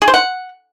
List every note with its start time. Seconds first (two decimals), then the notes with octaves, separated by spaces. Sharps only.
0.02 G#4
0.08 C5
0.14 F#5